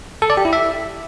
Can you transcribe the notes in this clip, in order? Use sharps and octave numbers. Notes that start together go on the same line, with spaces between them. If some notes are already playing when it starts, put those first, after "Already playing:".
A4
D5
G4
E4
E5